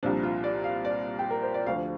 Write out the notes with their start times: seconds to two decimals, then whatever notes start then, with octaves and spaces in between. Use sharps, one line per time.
0.03 C2 A#2 F3 D4
0.23 F4
0.44 D5
0.64 F5
0.85 D5
1.19 G4
1.30 A#4
1.42 C5
1.54 D5
1.66 D2 D3 F3 F5